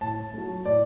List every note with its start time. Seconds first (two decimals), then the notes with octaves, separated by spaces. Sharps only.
0.01 A2 A5
0.34 F#3 A3
0.65 A2 D5